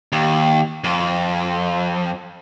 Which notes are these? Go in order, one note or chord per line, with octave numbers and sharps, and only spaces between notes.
D#2
F2